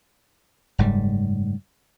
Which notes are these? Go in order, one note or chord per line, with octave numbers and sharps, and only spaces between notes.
F#1 G#2 G3